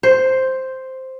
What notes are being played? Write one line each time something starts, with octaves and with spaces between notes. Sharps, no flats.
C5